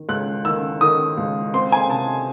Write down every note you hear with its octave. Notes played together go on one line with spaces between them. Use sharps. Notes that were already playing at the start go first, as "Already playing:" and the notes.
Already playing: D#3
C#2 F#6
D#3 E6
D#3 D#6
C#2
C4 C6
G#5
C3 A5